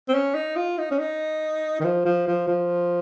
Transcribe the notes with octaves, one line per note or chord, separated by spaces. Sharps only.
C4
C#4
D#4
F4
D#4
C#4
D#4
D#3
F3
F3
F3
F3